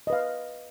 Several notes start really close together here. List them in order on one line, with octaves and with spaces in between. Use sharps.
D#5 B4 F5